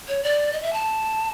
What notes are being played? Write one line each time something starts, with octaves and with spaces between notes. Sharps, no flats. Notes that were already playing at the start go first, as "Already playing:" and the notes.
C#5
D5
D#5
E5
A5